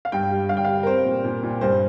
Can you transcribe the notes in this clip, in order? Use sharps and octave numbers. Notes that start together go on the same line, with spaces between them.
F5
G2 G5
G3
G2 F5
G5
F5
G3
A#4
C4 C5
A#2
A#2
A#2
G2 C5